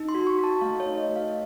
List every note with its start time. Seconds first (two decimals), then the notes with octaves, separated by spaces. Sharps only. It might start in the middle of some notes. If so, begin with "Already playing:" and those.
Already playing: D#4
0.09 C6
0.15 F#4
0.27 C#6
0.38 F#4
0.44 A5
0.61 A3 F5
0.80 C#5
0.86 D#4
0.98 D#5
1.09 A3
1.16 F5